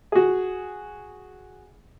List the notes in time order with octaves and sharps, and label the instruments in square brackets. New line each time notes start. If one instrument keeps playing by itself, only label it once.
[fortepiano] F#4 G#4